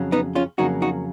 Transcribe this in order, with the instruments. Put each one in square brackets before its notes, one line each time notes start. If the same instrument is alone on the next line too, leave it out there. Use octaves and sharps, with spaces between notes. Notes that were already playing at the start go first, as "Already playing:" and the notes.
Already playing: [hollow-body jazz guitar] F2 C#3 F#3
B3 D#4
C#4 F4
F2 C#3 F#3 A#3 D#4 F#4
D#4 F#4